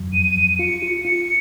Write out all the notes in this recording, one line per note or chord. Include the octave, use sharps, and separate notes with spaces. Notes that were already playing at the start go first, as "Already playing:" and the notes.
Already playing: F2 F#3
F2 D#7
F2
F4 C#7
F4
F4 C#7